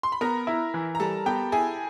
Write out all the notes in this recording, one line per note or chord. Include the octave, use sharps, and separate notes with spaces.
C6
B5
B3 A#4 A#5
E4
E3
A#5
G3 A4 A5
B3 G4 G5
E4 G#4 G#5